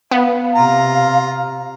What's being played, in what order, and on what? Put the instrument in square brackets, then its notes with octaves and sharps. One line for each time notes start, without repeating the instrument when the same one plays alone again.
[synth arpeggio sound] B3 [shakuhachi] F5
[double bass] C3 [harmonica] F4 A#5